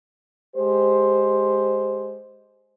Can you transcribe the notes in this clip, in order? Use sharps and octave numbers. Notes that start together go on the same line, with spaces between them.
G#3 G4 C5